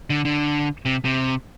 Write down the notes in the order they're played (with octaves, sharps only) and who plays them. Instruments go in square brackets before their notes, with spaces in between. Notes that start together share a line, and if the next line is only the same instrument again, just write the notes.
[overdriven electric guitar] D3
D3
C3
C3